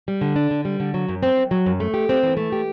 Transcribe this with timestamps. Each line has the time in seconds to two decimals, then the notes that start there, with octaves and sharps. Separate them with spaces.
0.08 G3
0.21 D3
0.36 D4
0.51 D3
0.65 G3
0.80 D3
0.94 F#3
1.08 F#2
1.23 C4
1.37 F#2
1.51 F#3
1.66 F#2
1.80 A3
1.94 G4
2.09 C4
2.23 E3
2.37 A3
2.52 G4